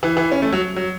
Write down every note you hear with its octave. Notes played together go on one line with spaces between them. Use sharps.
E3
E3
C#4
A3
F#3
F#3